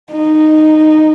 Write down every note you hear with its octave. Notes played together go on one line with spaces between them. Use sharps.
D#4